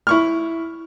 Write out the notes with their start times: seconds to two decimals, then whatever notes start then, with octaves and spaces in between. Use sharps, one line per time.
0.07 E4 C#6 F6